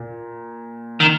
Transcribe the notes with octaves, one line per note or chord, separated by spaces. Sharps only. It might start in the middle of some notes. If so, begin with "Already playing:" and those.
Already playing: A#2
D#3